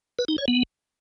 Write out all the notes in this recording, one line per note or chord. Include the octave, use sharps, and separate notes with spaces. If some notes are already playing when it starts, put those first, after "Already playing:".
B4
D#4
C#5
B3